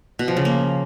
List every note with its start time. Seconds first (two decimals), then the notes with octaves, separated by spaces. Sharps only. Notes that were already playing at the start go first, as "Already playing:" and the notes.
0.19 B2
0.28 F3
0.37 C#3
0.45 A#3